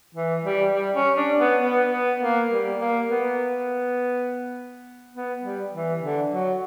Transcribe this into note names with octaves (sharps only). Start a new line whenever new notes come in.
E3
G3
G3
C#4
D4
B3
B3
B3
A#3
G3
A#3
B3
B3
G3
E3
D3
F#3